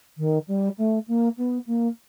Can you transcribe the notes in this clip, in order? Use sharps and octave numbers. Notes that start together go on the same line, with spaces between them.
D#3
G3
A3
A#3
B3
A#3